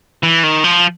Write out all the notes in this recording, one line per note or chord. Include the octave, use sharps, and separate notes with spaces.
E3
D#3
F3